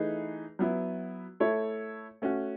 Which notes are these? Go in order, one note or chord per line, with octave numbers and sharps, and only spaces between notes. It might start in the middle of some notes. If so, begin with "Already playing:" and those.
Already playing: E3 A3 D#4 G#4 B4
F#3 B3 E4
A3 E4 A4 C#5
A3 C#4 F#4